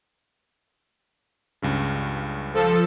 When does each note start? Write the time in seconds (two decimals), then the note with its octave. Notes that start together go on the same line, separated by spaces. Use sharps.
1.62 C#2 G2 C#3
2.54 F3 A4